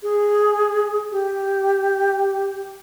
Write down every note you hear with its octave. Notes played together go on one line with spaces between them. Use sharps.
G#4
G4